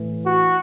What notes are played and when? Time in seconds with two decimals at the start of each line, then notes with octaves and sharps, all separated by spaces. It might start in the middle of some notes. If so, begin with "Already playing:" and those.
Already playing: A2 E3
0.25 F#4